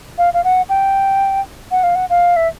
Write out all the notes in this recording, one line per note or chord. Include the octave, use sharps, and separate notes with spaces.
F5
F5
F#5
G5
F#5
F5
F#5
F5
E5